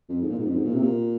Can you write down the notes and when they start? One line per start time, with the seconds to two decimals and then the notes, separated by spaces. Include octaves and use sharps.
0.09 F2
0.21 G#2
0.30 A#2
0.39 G#2
0.47 F2
0.56 G#2
0.65 A#2
0.74 C3
0.83 A#2